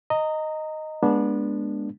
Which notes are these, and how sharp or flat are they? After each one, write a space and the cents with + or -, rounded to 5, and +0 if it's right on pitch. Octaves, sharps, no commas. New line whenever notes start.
D#5 +0 A#5 -20
G#3 +0 B3 -30 D4 +0